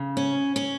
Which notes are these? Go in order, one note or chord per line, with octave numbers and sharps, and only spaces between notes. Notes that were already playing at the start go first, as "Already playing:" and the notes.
Already playing: C#3
C#4
C#4